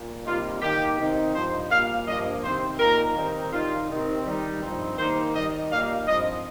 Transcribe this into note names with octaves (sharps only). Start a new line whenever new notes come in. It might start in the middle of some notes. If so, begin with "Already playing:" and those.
Already playing: A#2
C3 G3 A#3 D#4 F4
D#3 A#3 D#4 G4
C3 D#3 C4 D#4
G2 F3 D#4 C5
A#2 G3 A#3 F5
G2 F3 A#3 D#5
C3 D#3 C4 C5
A#2 A#3 D#4 A#4
D#3 G3 C4 D#4
D#3 G3 D#4 F4
C3 D#3 C4
D#3 G3 D#4
G2 F3 C4 D#4
D#3 G3 A#3 D#4 C5
D#3 G3 D#4 D#5
A#2 G3 A#3 D#4 F5
G2 F3 C4 D#4 D#5